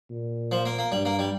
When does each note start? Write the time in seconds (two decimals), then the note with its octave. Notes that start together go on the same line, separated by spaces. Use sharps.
0.10 A#2
0.52 F3
0.65 A#3
0.79 A#3
0.92 G2 G3
1.05 A#3
1.19 G3